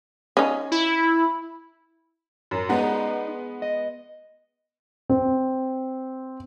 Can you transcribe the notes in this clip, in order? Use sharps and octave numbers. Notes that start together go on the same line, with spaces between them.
C#4 D#4
E4
F#2
G#3 B3 D#4 D5 D#5 F#5
D#5
C4